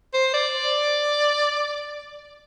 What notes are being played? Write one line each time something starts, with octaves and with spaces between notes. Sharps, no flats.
C5
D5